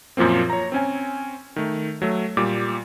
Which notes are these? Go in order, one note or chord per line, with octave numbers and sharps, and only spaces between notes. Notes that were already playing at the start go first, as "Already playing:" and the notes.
F#2 A#2 F3 A#3 C4
C#5 A#5
C4 C#4 G#5
D#3 A3
F#3 A3
A#2 G3 D6